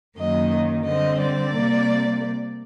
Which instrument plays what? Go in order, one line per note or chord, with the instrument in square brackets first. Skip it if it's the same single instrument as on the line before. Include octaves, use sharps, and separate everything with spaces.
[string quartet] F#2 D#3 F#3 A#3 D#5
D3 G3 C4 D#5
D5
C3 G3 A#3